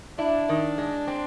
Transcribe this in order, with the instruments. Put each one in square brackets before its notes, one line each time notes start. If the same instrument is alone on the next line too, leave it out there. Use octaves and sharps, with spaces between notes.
[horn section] D4 [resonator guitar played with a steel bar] E4
[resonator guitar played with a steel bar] D#3
G#3
C4